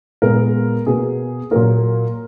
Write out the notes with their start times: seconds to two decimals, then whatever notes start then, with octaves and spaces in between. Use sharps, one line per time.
0.22 A#2 G#3 B3 A#4
0.87 B2 A#3 G#4
1.51 A#2 F#3 A#3 A#4